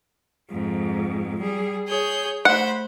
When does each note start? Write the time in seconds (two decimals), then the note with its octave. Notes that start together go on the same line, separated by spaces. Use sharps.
0.50 F2 G#2
1.40 G3 G#4
1.87 G#4 C#5 G6
2.45 A3 C5 F#5 B5